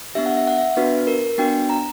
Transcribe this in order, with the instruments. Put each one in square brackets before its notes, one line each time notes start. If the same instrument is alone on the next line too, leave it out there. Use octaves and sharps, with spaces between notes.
[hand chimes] B3 D4 G4 E5
F#5
E5
F#5
E5
B3 D4 F#4 B4
A#4
B3 D4 F#4 G5
A#5